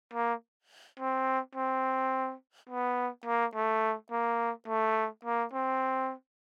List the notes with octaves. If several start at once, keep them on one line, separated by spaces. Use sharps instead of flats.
A#3
C4
C4
B3
A#3
A3
A#3
A3
A#3
C4